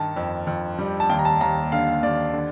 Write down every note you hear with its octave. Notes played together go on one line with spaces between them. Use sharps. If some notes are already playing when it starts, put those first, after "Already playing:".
Already playing: G2 D#3 A5
F2
F2
G3
A5
D#2 G5
A#5
A5
D#2 A#5
D3 F5
D#2 D5
D3